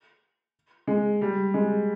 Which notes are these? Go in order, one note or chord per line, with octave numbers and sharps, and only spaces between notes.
G#3
G3
G#3